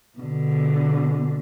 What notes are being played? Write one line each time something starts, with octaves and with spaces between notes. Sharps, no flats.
B2 D3